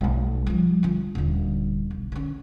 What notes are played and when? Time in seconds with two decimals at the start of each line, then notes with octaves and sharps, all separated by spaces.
0.01 B1 A3
0.46 F3 G3
0.83 D3 F4
1.15 D#1 D3
1.91 B1
2.12 D3 C#4